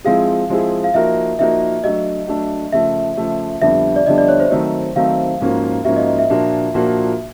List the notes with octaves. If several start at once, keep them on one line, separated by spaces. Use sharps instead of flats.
F3 G#3 C4 E4 G#4 F5
F3 G#3 C4 E4 G#4
F5
F3 A#3 D#4 F#4 A#4 E5
F3 A#3 D#4 F#4 A#4 E5
F#3 A3 D4 D#5
F#3 A3 D4
C#3 F3 A3 E5
C#3 F3 A3
F2 D3 G3 B3 D4 E5
D5
F2 D3 G3 B3 D4 D#5
D5
C#5
C5
D#3 F#3 A3 C4 D#4
D#3 F#3 A3 C4 D#4 F5
G#2 F3 A#3 C#4 F#4
G#2 F3 A#3 C#4 F#4 E5
D#5
D#5
E5
A#2 F3 A#3 D4 F#4
A#2 F3 A#3 D4 F#4